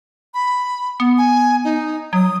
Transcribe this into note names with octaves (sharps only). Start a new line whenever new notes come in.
B5
B3
G#5
D#4
F#3 D#6